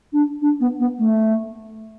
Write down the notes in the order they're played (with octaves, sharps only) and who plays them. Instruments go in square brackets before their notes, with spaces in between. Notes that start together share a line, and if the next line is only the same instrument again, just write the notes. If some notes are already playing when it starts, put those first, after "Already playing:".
[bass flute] D4
D4
B3
B3
A3